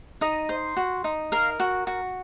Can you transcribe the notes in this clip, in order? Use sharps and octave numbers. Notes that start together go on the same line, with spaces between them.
D#4 D#5
C5
F#4
D#4
A#4 F5
F#4
F#4